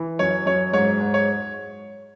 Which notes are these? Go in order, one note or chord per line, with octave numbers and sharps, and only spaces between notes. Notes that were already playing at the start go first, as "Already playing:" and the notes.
Already playing: E3
F#2 C#5
F#2 C#5
G#2 C#5
G#2
C#5